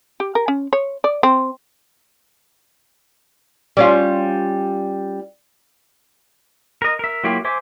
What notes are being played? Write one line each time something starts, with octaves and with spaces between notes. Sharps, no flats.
G4
A#4
C#4
C#5
D5
C4
G3 C#4 F4
A#4 D#5
A#4 E5
F#3 A#3 E4 F4 G4
C5 E5 G#5 D6